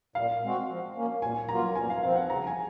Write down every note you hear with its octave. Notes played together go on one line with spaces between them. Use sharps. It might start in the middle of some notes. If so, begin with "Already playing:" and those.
A#2 F5
G#3 C4 F#4
F3
A#3 C#4
A#2 G#5
F#3 A#3 F4 A#5
A#2 G#5
F5
F3 C4 F5
F#5
C#3 A#5
G#5